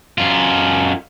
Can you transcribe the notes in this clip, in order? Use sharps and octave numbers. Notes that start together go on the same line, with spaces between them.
F#2 F4